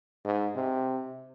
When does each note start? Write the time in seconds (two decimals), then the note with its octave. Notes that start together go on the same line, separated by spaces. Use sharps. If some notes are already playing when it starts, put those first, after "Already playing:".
0.25 G#2
0.55 C3